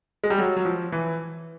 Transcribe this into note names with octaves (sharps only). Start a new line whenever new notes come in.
G#3
G3
F#3
F#3
F3
E3